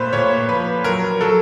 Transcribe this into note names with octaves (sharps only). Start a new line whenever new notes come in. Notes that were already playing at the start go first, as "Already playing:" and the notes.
Already playing: A#2 A3 B4 C5
A#2 C#5
F3 B4
F#3 A#4
F#3 A4